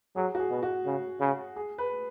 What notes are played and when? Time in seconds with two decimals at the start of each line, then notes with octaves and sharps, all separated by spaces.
0.16 F#3 G#4
0.35 F#4
0.39 G#4
0.51 B2
0.63 F#4
0.86 C#3
1.20 C#3
1.56 G#4
1.78 B4